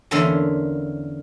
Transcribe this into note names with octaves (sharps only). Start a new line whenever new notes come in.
E2 D3 A#3 C#4 E5 C6